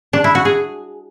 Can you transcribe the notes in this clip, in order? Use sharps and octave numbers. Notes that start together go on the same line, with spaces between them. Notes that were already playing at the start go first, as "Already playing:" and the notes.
D4
E4
F#4
G#4